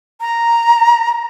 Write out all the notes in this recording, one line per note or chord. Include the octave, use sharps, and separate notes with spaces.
A#5